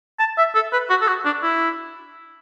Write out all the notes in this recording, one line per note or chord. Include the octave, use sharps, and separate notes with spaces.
A5
E5
A4
B4
F#4
A4
F#4
D4
E4